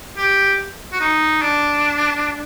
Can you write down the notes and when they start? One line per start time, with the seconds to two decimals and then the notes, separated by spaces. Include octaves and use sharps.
0.17 G4
0.93 F#4
1.01 D#4
1.42 D4